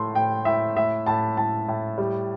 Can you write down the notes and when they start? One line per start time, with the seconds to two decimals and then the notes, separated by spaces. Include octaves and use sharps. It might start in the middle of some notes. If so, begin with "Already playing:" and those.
Already playing: A2 A3 C6
0.15 A2 G5
0.45 A2 E5
0.76 A2 E5
1.06 A2 A5
1.37 A2 A5
1.68 A2
1.98 G3